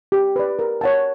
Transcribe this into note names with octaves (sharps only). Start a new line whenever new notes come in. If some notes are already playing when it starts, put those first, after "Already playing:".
G4
B4 D5
A#4
C#5 F#5 A5